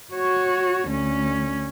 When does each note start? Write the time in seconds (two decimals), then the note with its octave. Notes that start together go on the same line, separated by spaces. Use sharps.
0.14 F#4 C#5
0.89 D2 C#4